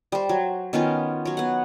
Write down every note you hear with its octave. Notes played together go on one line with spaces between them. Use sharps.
G3 C5
F#3
D#3 B3 C#4 F4
F#3 C#5
B3 F#5